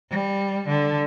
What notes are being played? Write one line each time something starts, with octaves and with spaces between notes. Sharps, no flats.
G3
D3